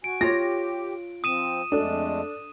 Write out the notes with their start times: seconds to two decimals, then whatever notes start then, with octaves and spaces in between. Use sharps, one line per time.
0.04 F#4 G#5 D7
0.21 F4 G4 C#5 A#6
1.24 F3 C4 D#6 D#7 E7
1.72 F2 G#3 A3 D4 A4